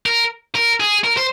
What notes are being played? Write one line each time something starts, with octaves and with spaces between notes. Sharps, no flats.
A#4
A#4
G#4
A#4
C5